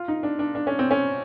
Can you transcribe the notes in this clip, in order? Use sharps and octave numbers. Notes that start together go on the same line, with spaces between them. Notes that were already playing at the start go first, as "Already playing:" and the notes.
Already playing: F4
D#4
D4
D4
D4
C#4
C4
C#4